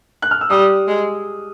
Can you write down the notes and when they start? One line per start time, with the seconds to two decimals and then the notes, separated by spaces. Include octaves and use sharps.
0.22 F#6
0.31 F6
0.41 E6
0.50 G3 D#6
0.87 G#3